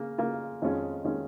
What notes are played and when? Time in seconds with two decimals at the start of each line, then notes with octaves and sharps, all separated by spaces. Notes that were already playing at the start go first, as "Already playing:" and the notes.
Already playing: C#3 A#3
0.18 C#3 A#3 F4 A#4
0.62 F2 D#3 G#3 C#4 F4
1.05 D#3 G#3 C#4 F4